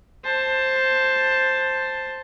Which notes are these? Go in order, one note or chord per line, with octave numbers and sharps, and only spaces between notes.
C5 A5